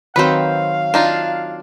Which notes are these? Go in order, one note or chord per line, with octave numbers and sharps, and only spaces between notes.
D#3 F#3 C4 B4 C5 F5
D4 D#4 F4